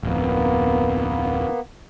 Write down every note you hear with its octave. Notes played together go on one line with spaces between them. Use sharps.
D1 F2 A#3 B3